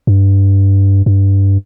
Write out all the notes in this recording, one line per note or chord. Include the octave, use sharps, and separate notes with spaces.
G2
G2